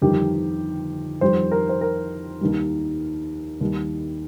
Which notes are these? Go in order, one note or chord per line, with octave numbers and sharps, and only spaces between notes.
G1 F2 D#3 G3 G4
F2 D#3 G3 C5
A#4
C5
A#4
D#2 D#3 G3
D#2 D#3 G3